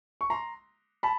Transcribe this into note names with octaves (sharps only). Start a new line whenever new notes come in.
C#6
A#5 C6
A5 B5